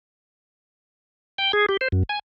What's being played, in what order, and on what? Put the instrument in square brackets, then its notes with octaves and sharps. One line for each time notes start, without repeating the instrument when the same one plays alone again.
[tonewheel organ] G5
G#4
G4
C5
F#2
G#5